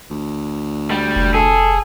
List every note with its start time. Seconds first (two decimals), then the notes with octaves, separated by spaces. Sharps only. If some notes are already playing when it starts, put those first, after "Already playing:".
0.11 D2
0.91 G3
1.16 F1
1.34 G#4 A4